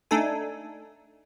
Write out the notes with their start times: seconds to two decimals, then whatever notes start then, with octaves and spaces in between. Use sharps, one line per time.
0.11 A3 D4 D#4 A4 G#5